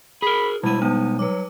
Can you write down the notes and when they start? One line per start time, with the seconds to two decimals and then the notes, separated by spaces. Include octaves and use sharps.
0.22 G#4 A#4 B5
0.63 B2 G3 G#3 E4 D#7
0.82 G3 B3 D#4
1.19 F#3 B4 D6